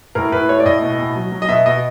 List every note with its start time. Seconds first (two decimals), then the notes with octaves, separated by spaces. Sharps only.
0.15 A2 A#4
0.32 A2 B4
0.49 A3 C#5
0.60 D5
0.66 A2 D#5
0.82 B2
0.99 B2
1.16 F#3
1.32 F#3
1.42 D#5
1.49 B2 E5
1.66 B2 D#5